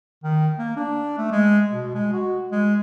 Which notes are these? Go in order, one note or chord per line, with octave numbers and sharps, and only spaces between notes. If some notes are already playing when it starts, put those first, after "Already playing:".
D#3
A#3
D4
A3
G#3
B2
G#3
F#4
G#3